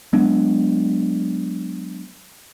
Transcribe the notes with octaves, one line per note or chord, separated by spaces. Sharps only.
F#3 G#3 B3 D4